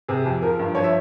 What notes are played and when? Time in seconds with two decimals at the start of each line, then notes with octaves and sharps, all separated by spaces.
0.08 C3 G#4
0.25 F2
0.42 F3 A#4
0.59 G2
0.75 F3 C#5
0.84 E5